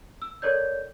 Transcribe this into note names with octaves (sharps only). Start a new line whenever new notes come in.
E6
A4 A#4 C#5 D5 G6